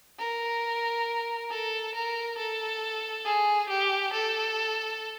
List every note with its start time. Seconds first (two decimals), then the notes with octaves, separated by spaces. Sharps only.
0.19 A#4
1.50 A4
1.94 A#4
2.38 A4
3.25 G#4
3.69 G4
4.13 A4